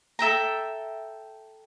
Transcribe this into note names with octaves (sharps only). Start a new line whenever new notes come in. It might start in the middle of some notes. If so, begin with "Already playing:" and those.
A4 E5 G5 A#5